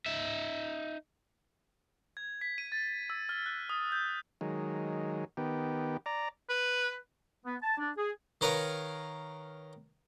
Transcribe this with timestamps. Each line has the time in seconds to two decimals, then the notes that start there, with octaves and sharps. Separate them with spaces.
0.06 D#4 E5
2.17 G#6
2.41 B6
2.58 D#7
2.72 A6
3.10 E6
3.29 F6
3.46 F#6
3.70 D#6
3.92 G6
4.41 D#3 F#3 G#3
5.37 D#3 B3 G4
6.06 D5 A#5
6.50 B4
7.46 B3
7.62 A5
7.78 D4
7.98 G#4
8.41 D#3 A#4 B4 C#5 F5